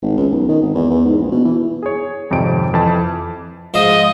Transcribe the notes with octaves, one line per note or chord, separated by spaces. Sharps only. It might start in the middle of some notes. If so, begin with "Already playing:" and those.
G#1
C#2
B1
D#3
G#1
E2
E2
G#2
A#1
B2
E3
G#4 C#5
G#1 F2 C3 D7
F2 E3 A5
G#2 F3 C5 D#5